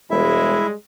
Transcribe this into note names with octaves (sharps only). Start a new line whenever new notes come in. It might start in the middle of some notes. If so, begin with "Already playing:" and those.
E1 G3 G#3 E4 E5